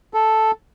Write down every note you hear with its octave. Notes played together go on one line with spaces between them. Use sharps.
A4